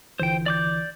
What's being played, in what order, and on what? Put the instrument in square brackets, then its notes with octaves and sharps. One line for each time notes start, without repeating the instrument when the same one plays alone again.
[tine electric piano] G1 D3 E3 [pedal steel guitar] C5 G5
[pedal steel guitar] D5 D6 G6